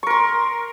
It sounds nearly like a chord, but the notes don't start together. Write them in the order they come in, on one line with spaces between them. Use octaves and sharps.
C#6 A#4 C6